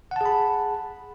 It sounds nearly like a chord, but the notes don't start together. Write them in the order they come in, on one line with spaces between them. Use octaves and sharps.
F#5 A5 G#4 B5